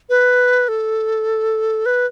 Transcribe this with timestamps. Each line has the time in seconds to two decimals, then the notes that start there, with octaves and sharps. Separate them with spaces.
0.09 B4
0.68 A4
1.86 B4